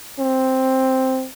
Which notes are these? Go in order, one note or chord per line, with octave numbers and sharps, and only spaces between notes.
C4